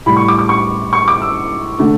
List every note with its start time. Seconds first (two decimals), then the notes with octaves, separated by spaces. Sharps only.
0.06 A2 G3 B5
0.17 C#6
0.28 D6
0.39 D6
0.49 C#6
0.93 C#6
1.08 D6
1.22 E6
1.79 D3 A3